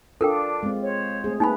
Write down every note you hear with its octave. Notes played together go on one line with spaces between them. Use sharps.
D4 F4 A4 A#4 G5
G#3 C4
C5 C#5
A3 C4 G#4
A#3 D#4 B4 G#5 B5